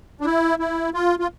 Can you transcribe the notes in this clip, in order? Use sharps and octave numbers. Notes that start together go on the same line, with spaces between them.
D4
E4
E4
F4
F4